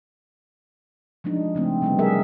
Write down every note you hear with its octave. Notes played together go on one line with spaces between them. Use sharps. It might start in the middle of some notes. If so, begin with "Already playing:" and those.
F3 G#3 D4 D#4
C#3 A3 C4
C3 G3 B3
G#3 G#4 A#4 E5